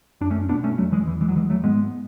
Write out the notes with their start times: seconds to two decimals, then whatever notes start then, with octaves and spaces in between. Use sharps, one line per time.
0.21 F#2 D4
0.30 A3 C#4
0.49 B2 B3 D4
0.64 A3 C#4
0.78 E2 F#3 A3
0.92 E3 G#3
1.06 E2 E3
1.21 E3 G#3
1.29 F#3
1.35 E2 E3 G#3
1.50 F#3 A3
1.64 G#2 G#3 B3